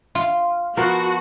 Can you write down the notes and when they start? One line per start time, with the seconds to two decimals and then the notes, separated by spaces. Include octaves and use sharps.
0.15 F4
0.77 F3 B3 F#4 A#4